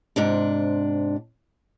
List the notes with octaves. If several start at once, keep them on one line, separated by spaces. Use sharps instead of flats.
G#2 C3 D4